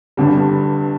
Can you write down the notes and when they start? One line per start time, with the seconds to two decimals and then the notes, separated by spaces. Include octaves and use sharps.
0.17 G1 G2 D3 G3